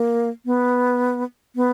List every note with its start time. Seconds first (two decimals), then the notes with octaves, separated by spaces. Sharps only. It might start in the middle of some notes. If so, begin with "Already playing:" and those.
Already playing: A#3
0.46 B3
1.56 B3